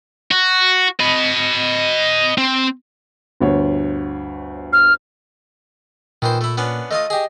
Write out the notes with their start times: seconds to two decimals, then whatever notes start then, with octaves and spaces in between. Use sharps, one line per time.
0.31 F#4
1.00 D#5 B5
2.38 C4
3.40 G1 D2 C#5
4.73 F6
6.22 A#2 D#3 E3 C5
6.41 A3 E4
6.57 B3 C#4 D4
6.91 A3 F4 D#5 D#6
7.10 G4 G#4